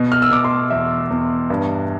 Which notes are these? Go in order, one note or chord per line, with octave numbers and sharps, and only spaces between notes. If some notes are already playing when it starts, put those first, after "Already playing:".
Already playing: B2
F6
E6
B2 D6
C6
E2 E5
E2
G2